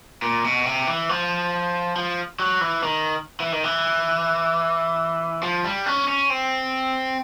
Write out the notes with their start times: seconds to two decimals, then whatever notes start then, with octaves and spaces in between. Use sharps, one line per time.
0.22 A#2
0.44 B2
0.65 C3
0.87 E3
1.09 F3
1.96 F3
2.40 F#3
2.61 E3
2.83 D#3
3.40 E3
3.52 D#3
3.64 E3
5.43 F3
5.64 G3
5.86 C#4
6.08 C#4
6.30 C4